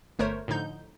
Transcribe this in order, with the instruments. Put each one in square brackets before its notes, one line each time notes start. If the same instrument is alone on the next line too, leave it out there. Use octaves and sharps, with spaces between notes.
[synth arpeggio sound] G1 A3 A#4 C5 C#5
A2 D3 F3 D#4 G6